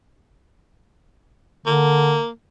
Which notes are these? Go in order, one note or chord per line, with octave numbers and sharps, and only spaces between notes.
D3 A#3